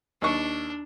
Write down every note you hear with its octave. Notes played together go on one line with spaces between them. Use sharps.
D#2 D4 C#6